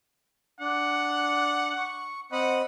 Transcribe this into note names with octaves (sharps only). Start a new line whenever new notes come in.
D4 F#5
C#6
C4 D#5 F#5 B5